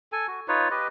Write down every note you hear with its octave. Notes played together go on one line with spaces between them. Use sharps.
A4 G#5
F#4
D#4 F4 B4 C#5
G4 B4 D#5